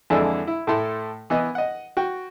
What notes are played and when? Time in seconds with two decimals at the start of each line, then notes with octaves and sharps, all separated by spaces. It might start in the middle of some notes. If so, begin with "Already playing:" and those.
0.10 F2 D3 E3 G#3 D4 E4
0.47 E4
0.67 A2 A3 E4 A4 C6
1.30 E3 B3 D#5
1.55 D#5 F#5
1.97 F#4 G5